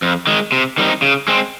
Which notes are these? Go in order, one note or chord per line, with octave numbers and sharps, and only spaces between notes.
F2
D#3 G#3
C3
D#3 G3 C4 D#4
C#3
G#3 C4